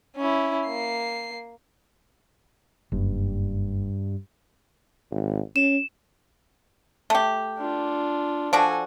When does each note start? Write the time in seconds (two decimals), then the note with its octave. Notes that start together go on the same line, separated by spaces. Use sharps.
0.17 C#4 E4
0.67 A#3 C7
2.92 F#1 G2
5.11 G#1
5.56 C#4 E7
7.10 A3 G4
7.58 D4 F4
8.53 F3 D4 F#4 A4 G#5